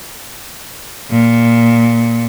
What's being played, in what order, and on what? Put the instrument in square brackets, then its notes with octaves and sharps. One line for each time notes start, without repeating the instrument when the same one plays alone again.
[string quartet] A#2